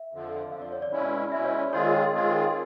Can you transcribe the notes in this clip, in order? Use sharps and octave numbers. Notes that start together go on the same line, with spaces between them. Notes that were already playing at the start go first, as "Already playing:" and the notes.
Already playing: E5
F2 D3 F3
F2 D3 F3 F5
D5
C#5
D5
B2 G#3 C#4 E4
B2 G#3 C#4 E4 E5
C#5
D5
D#3 G#3 C4 F4 G#4 C#5
D#3 G#3 C4 F4 G#4